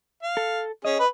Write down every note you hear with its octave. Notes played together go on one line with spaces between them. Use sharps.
F5
A4
C#4 G#4 D#5
B4